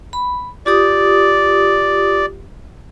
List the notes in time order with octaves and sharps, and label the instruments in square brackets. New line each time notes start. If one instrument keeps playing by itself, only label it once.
[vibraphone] B5
[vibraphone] F4 G4 D#6 [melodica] D5